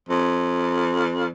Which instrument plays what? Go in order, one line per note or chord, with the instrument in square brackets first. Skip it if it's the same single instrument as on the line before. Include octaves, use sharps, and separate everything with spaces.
[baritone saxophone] F2